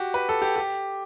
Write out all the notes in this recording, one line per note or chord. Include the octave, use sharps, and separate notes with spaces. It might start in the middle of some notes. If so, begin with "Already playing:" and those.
Already playing: F#4 G4
B4
A4
G4
G4